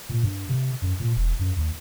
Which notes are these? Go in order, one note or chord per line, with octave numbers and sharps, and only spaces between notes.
A#2
G2
C3
F#2
A#2
E1
F#2
D#2